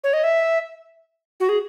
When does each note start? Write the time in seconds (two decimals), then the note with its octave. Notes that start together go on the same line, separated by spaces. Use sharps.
0.04 C#5
0.13 D#5
0.23 E5
1.40 F#4
1.49 G#4